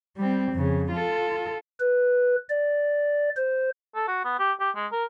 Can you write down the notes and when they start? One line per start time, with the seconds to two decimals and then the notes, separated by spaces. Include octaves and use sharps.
0.17 G3 C4
0.52 F2 C#3
0.92 F4 A4
1.80 B4
2.49 D5
3.36 C5
3.95 A4
4.08 F#4
4.25 B3
4.39 G4
4.60 G4
4.76 G#3
4.92 A#4